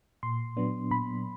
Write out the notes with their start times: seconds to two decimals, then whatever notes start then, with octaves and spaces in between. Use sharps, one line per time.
0.23 A#2 C6
0.57 F#3 B3 D4
0.91 A#2 B5